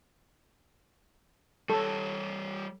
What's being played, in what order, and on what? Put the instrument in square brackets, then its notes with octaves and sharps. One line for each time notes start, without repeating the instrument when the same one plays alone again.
[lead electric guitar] G3 C#5 [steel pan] A4